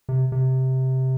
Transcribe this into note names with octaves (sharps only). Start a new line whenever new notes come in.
C3
C3